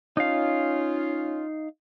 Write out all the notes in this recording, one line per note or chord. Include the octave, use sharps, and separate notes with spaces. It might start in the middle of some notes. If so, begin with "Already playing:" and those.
C#4 D#4 F4 F5